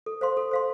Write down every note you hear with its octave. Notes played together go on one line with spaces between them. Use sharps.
A4
C5 F5 C6
A4
C5 F5 C6